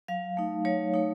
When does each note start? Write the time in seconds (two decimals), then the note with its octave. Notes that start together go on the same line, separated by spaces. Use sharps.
0.08 F#3 F5
0.37 A3 D#4
0.65 F#3 C#5
0.94 A3 D#4